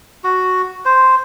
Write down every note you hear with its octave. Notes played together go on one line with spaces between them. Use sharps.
F#4
C5